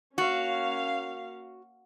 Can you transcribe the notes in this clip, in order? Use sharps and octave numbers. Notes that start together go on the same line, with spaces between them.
A#3 C#4 F#4 F5